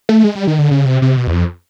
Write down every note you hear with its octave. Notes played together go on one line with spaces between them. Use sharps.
A3
G#3
G3
D#3
D3
C#3
C3
C3
B2
E2
F2